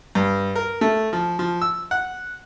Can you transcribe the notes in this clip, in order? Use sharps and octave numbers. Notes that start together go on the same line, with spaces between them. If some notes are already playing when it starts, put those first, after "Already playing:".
G2
A#4
A3
F3
F3
E6
F#5